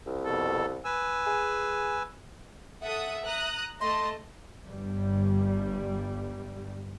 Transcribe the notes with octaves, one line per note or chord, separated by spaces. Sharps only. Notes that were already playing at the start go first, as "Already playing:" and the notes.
C2
F2 B2 A4
B4 G#5 E6
G#4
A4 E5 F#5 D#6
A#5 D#6 F#6
A3 D#5 A5 C6
G1 G2 G3